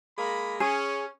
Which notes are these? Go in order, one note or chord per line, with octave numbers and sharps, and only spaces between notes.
G#3 A#3 B5
C#4 G#4